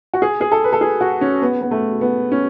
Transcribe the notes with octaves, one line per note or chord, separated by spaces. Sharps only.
F#4
G#4
G#4
A4
B4
A4
G#4
F#4
C#4
B3
B3
A3
B3
C#4